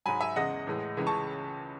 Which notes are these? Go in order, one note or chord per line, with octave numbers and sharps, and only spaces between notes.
G#2 F#3 G#5 B5
E5 G#5
E2 C#3 G#3 D#5 F#5
A2 E3 G#3
C#2 C#3 E3 G#3
A5 C#6